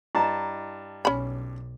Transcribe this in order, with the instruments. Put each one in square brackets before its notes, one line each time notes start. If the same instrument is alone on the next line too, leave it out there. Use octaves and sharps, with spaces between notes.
[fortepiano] G2 A5 [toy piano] E4 D#5 A#5
[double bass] B1 [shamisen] C#4 B5